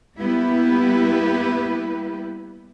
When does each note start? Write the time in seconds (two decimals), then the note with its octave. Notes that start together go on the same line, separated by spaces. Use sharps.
0.17 G3 A#3 B3 E4 G4 B4